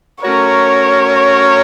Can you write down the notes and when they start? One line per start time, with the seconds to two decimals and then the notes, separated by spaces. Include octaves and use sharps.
0.23 A3 C#4 F#4 A#4 C#5